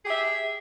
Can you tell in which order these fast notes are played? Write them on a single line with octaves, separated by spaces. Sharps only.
G#4 G4 E5